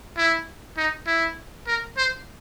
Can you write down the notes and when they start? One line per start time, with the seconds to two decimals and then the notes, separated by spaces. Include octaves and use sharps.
0.17 E4
0.77 D#4
1.07 E4
1.67 A#4
1.97 C5